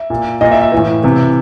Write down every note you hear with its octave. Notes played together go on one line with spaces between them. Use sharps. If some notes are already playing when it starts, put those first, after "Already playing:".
Already playing: E5
A#2
A#2 D#5
E5
E5
E3
A2
C3 E3